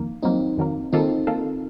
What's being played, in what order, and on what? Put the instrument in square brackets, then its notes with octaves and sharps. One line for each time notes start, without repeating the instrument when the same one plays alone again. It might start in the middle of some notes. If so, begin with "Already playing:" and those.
Already playing: [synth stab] F2 D#3 A#3
[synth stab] F2 D#3 F#3 A#3 [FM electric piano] C4 D#4
[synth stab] F2 D#3 F#3 A#3
[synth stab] D#3 A#3 F4 A4 [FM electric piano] C4 D#4
[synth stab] D#3 A#3 F4 A4